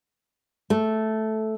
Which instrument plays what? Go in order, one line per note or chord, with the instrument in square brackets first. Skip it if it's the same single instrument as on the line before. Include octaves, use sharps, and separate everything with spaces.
[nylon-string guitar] A3